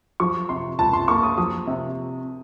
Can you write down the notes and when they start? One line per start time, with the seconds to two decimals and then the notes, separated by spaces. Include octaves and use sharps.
0.20 F3 C#6
0.49 C3 C6
0.79 C#2 A5
0.93 C6
1.08 A#3 C#6
1.23 D#6
1.38 F3 D#6
1.67 C3